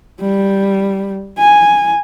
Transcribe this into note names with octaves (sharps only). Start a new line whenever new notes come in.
G3
G#5